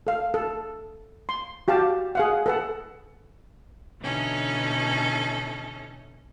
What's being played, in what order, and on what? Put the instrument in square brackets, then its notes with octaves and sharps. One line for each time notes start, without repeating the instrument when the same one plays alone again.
[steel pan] A4 F5
A4
C6
F#4 G4 F5 A5
G#4 F5 F#5
A4 B4 F#5
[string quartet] B2 D3 E3 C#4 D#4 A4